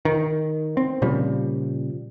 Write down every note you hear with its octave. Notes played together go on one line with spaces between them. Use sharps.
D#3
C4
A#2 C#3 F3 G3